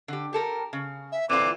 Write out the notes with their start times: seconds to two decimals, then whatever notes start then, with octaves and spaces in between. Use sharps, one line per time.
0.08 D3 G4
0.33 G4 A4 A#4
0.73 C#3
1.12 E5
1.29 A#2 D3 E3 C4 F4 D6